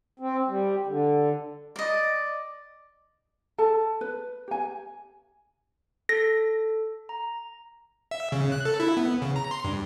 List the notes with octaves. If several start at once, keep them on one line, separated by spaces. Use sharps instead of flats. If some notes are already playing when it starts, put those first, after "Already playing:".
C4
G3
D3
D5 D#5
A4 A5
B4
G4 G#5
A4 A#6
A#5
E5
C#3
F#6
A4
E4
B3
C#3
A#5
C6
G2